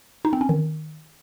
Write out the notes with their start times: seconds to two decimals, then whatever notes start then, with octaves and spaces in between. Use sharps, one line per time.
0.25 D#4
0.33 C4
0.41 C#4
0.49 D#3